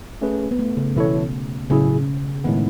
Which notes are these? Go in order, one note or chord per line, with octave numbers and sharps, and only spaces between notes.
A3 C#4 G#4 B4
B3
A3
C#3
B2 E3 A3 E4 A4 C#5
A2 C#3 F#3 C#4 E4 G#4
A2 D#3 G#3 B3